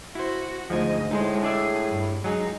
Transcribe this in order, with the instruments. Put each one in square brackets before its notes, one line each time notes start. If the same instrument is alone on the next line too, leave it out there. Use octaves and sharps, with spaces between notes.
[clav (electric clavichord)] E4 C5 [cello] F#4
[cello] D2 D#5 [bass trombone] G#2 [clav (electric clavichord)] F3 G#5
[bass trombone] A2 [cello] G#3 [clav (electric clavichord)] D#4 G#4 C5
[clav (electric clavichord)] D4 D5 E5 [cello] G#4
[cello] G2
[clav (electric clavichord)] F#3 G#4 [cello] G#3 D#4